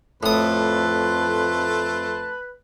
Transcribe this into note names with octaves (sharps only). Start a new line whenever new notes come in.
F2 A2 A3 B4 A5 C6 D#6